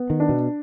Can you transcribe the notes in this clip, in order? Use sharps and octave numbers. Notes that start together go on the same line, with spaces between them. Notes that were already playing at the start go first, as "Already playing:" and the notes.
Already playing: B3
D#3
D4
B2